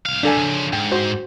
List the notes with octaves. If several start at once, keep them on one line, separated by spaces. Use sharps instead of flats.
C2 F5
D3 G3 D4 A4 G#5
C#3 F3
G#2 G5
F#4 C5